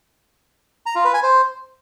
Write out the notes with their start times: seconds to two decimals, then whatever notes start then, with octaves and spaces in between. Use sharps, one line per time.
0.86 A#5
0.95 F4
1.05 B4
1.14 G#5
1.23 C5